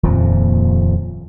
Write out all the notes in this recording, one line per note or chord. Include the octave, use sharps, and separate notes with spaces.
D#1 F2 A#2 F3